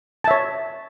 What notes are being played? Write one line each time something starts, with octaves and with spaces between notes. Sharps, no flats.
C#5 E5 A5